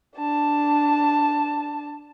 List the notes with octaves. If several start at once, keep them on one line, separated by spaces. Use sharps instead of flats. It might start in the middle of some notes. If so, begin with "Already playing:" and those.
D4 A5